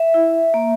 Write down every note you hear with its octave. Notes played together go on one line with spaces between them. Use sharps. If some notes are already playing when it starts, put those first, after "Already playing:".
Already playing: E5
E4
A#3